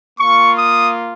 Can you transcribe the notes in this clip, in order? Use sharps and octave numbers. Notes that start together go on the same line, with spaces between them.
A#3 F4 C#6
D#6